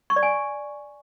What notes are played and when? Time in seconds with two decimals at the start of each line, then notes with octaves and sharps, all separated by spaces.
0.10 C#6
0.16 D5
0.23 G#5